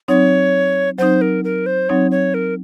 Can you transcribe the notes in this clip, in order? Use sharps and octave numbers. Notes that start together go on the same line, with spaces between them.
F#3 C4 D#4 C#5
F#3 C4 D#4 C5
A#4
A#4
C5
F#3 C4 D#4 C#5
C#5
A#4